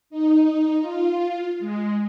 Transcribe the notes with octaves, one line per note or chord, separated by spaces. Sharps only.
D#4
F4
G#3